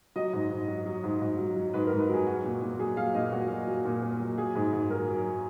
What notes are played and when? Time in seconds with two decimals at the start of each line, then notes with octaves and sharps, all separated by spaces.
0.16 F#3 D#5
0.33 G#2
0.51 G#2
0.68 F#3
0.86 F#3
1.04 G#2
1.21 G#2
1.39 F#3
1.56 F#3
1.74 G#2 B4
1.87 A#4
1.92 G#2
2.00 B4
2.09 F#3 G#4
2.27 F#3 F#4
2.44 A#2
2.62 A#2
2.79 F#3 G#4
2.97 F#3 F5
3.14 A#2 D#5
3.32 A#2 F#4
3.50 F#3
3.67 F#3
3.85 A#2
4.02 A#2
4.20 F#3
4.38 F#3 G#4
4.55 G#2
4.73 G#2
4.90 F#3 A#4
5.08 F#3